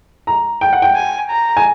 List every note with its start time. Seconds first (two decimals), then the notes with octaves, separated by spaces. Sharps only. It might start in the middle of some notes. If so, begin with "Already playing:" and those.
0.27 A#5
0.61 G5
0.73 F#5
0.82 G5
0.96 G#5
1.30 A#5
1.57 G#5